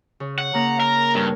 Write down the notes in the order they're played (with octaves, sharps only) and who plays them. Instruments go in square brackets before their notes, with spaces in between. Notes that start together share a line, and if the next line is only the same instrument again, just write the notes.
[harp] C#3
[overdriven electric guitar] F#5
[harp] C#3 A#3 [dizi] A#5
[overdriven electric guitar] A#4
[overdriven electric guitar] G2 [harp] A#4 C#5